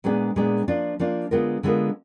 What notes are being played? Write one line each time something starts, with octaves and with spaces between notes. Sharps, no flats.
A#2 G#3 B3 D4 G#4
A#2 G#3 B3 D4 G#4
F3 A#3 D4 F4
F3 A#3 D4 F4
D3 G#3 B3 F4 A#4
D3 G#3 B3 F4 A#4